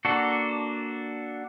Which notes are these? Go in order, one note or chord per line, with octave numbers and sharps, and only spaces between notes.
A#3 D4 F#4 A4